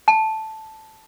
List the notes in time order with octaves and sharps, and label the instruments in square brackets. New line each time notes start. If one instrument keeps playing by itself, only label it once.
[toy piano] A5